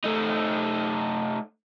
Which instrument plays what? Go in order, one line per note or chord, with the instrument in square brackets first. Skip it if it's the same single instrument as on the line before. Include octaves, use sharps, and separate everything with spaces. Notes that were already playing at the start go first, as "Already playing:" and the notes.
[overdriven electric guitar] A3 D#4